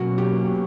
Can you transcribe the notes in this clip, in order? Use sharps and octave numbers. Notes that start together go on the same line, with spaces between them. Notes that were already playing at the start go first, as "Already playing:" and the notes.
Already playing: B2 F#3 A#3 C#4 F#4
G4